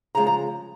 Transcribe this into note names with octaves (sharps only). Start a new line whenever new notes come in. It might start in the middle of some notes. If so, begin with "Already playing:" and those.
C#3 F3 G#3 A#5
A#5